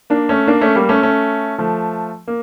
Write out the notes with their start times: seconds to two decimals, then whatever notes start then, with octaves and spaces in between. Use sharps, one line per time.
0.10 A#3 D4
0.29 A3 C#4
0.47 A#3 D4
0.61 A3 C#4
0.75 G3 A#3
0.89 A3 C#4
1.02 A3 C#4
1.58 F3 A3
2.28 A#3